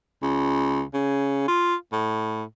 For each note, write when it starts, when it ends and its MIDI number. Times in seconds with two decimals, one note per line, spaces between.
0.22 0.83 37
0.94 1.46 49
1.48 1.75 65
1.93 2.43 45